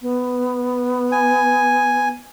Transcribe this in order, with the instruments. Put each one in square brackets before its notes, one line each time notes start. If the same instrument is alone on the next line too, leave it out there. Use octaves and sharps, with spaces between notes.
[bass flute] B3
[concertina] G#5